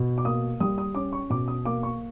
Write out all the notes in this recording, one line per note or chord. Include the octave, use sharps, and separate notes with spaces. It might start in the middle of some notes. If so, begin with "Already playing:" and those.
Already playing: B2
D6
A#3 D#6
G3 D#6
D#6
C#4 D6
C#6
B2 D6
D#6
A#3 D6
C#6